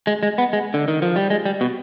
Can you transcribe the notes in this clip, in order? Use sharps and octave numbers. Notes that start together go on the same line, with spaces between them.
G#3
G#3
B3
G#3
D3
D#3
F3
G3
G#3
G3
B2